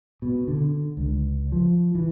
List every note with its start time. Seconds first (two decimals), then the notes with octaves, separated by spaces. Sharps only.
0.22 B2
0.48 D3
0.97 C#2
1.52 F3
1.95 E3